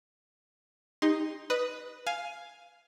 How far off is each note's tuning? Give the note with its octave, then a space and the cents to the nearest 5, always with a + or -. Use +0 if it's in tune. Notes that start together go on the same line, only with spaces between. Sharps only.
D#4 +0 G4 +30 C6 +0
B4 +0 D#5 -25 D#6 +0
F5 +0 G#5 +10